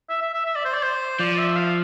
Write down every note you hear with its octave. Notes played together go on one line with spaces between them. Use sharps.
E5
E5
E5
E5
D5
C5
D5
C5
F3 D5
E5
F5